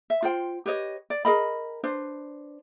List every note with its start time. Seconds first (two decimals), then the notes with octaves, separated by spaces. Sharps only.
0.10 E5
0.22 F4 C5 G5
0.66 G4 B4 C#5 D#5
1.10 D5
1.25 G#4 A#4 D#5 B5
1.83 D4 B4 C5